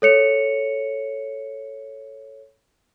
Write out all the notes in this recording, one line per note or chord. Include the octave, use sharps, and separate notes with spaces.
A4 C#5 C#7 F7